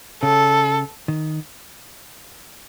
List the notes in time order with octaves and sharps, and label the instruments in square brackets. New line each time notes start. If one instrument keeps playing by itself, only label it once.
[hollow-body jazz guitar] C#3 [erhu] A4
[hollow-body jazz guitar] D#3